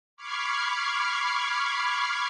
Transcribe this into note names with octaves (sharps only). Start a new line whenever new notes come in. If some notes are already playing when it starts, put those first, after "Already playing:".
B5 C#6 D6 F6 G#6 C7